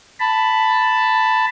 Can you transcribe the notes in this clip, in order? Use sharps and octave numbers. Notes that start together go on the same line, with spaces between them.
A5 B5